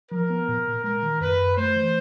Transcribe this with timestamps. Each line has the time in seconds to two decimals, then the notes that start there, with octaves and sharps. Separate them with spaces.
0.12 F3 A#4
0.30 B3
0.48 A#2
0.67 A#2
0.84 G#3 A#4
1.03 D#3
1.21 F#2 B4
1.39 F#2
1.57 A3 C5
1.76 E3